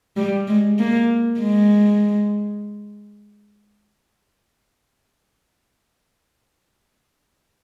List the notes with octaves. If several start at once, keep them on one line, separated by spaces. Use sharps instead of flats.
G3
G#3
A#3
G#3